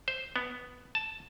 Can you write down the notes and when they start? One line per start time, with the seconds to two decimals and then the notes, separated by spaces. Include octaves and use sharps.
0.08 C5
0.36 B3
0.95 A5